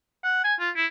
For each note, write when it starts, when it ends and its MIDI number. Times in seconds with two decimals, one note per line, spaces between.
0.24 0.40 78
0.44 0.54 80
0.60 0.70 65
0.76 0.86 64